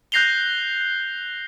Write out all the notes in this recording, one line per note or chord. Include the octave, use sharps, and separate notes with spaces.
F#6 G6 A#6 C7 F7 G7